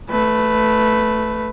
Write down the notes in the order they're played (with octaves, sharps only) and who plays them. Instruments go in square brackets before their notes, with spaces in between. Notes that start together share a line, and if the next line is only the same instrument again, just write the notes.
[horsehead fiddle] A3 B4